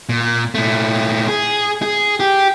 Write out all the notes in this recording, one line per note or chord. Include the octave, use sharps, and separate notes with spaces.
A#2
A#2 A3
G#4
G#4
G4